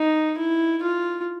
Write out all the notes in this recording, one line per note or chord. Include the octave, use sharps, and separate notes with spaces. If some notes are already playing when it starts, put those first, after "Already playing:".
Already playing: D#4
E4
F4